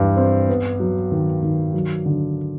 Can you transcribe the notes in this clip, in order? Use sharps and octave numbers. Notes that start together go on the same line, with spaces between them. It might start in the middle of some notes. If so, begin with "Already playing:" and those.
Already playing: G2 E3
C4
B3
F#3
D#3
D#3
F#3
D3